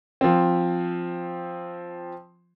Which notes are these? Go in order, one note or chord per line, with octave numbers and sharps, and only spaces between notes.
F3 C4